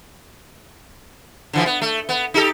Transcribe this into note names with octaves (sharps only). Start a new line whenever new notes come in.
D3 E3 F3
B3
A3
B3
D#4 G4 A4